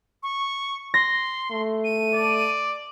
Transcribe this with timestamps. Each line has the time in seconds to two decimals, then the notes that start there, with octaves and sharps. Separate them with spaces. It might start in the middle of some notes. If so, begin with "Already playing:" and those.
0.23 C#6
0.94 C6 A#6
1.51 A3
1.84 D#7
2.15 D5